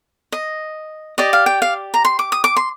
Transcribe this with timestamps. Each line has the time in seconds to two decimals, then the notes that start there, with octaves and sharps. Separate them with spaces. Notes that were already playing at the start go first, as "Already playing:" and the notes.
0.32 D#5
1.18 G4 D5 D#5
1.33 F5
1.46 G5
1.62 F5
1.94 A#5
2.05 C6
2.19 D6
2.32 D#6
2.44 D6
2.56 C6